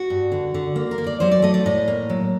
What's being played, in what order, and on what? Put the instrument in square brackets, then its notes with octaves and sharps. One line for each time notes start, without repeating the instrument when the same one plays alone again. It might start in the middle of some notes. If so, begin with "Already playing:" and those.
Already playing: [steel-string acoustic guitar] F#4
G2
D3
D3
A#3
A#4
A#3
D5
F#3 C5
D5
A3 D#5
D5
A2 D#5
A#3
F#3